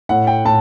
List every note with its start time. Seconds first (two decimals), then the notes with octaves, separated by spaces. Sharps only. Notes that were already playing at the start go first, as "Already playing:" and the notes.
0.09 A2 F#5
0.27 G5
0.45 A2 A5